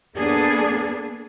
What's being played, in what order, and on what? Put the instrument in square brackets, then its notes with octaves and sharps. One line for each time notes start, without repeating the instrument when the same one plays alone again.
[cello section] A#3 B3 D4 G#4 A4